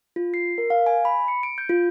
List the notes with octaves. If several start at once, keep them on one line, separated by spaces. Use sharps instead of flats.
F4
C7
A#4
F5
G#5
B5
C#7
D7
G6
F4